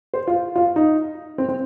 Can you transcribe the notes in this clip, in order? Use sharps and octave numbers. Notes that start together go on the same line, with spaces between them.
C5
F4
F4
D#4
C4
C4